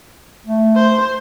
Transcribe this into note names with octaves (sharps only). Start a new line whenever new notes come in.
A3
C5